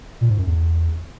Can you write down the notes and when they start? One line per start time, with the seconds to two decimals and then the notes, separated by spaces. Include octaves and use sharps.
0.21 A#2
0.29 G#2
0.38 F#2
0.46 E2